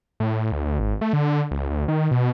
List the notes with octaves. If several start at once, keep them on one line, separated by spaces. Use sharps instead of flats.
A2
D2
D2
G#1
A3
D3
C#2
D2
D#3
B2